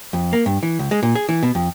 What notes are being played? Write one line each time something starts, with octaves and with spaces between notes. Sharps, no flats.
F2
A#3
G2
E3
C#2
G#3
A#2
G#4
E3
B2
F2